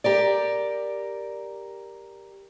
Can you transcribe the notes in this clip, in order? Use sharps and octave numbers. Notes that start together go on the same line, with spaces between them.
G4 A#4 D5